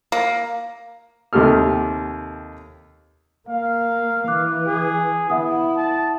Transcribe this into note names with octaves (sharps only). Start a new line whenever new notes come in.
A#3
D#2 C3 G4 A4 F6
A#3 F5
E3 D6 F#6
G#4
B3 E4 E5 F#5 D#6
A5